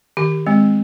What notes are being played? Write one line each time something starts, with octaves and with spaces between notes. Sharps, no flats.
D#3 G4
G#3 C4